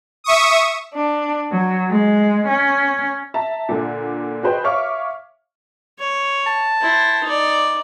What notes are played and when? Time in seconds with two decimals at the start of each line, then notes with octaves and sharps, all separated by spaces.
0.24 E5 C#6 D#6
0.94 D4
1.52 F#3
1.91 G#3
2.48 C#4
3.34 E5 A5 A#5
3.69 A#2 D3
4.43 F#4 G#4 B4 C5 D#5 G5
4.64 C#5 E5 F5 C#6 D6 F6
5.99 C#5
6.46 A5
6.81 E4 C5
7.24 D#4 D5